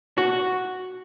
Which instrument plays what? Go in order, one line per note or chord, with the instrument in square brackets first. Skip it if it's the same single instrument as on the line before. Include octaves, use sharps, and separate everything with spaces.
[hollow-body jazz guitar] F#4